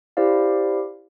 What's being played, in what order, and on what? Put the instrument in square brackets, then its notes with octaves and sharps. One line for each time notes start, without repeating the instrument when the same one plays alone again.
[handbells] E4 G4 C5 D5 F5